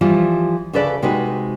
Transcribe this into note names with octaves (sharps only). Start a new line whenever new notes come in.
E3 F3 G3 F4
D2 C#3 A4 B4 D5
C3 G#3 D#4 F#4 B4